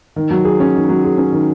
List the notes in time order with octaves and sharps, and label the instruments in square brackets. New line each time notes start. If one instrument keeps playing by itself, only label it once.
[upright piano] D#3
F#3
G#4
C#4
D#3
F#3
G#4
C#4
D#3